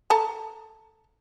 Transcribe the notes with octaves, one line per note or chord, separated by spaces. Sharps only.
A4 A5 A#5